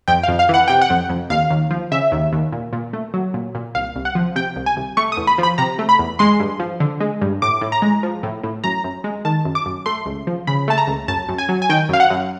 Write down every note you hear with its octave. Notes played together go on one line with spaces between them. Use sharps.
F2 G5
F5
F2
F5
E3 F#5
C3 G5
F#5
F2
F2
D#2 F5
D#2
F3
C#3 E5
D#2
D#2
A#2
A#2
A3
F#3
A#2
A#2
C2 F5
C2
F#5
F3
C3 G5
C2
G#5
C2
A3 C#6
D#6
E2
B5
F3 B5
C3 A#5
A3
B5
E2
G#3 C6
G2
F3
D3
G#3
G2
A2 D6
A2
A#5
G#3
F3
A2
A2
F#2 A#5
F#2
G#3
D#3 A5
F#2
D6
F#2
A3 C6
C#2
F3
C#3 B5
A3 A5
A#5
C#2
F#2 A5
F#2
G#5
F#3
G#5
D#3 G5
F#2 F5
F#5
F#2